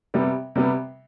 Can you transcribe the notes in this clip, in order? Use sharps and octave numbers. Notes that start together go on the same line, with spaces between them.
C3 G3 B3
C3 G3 B3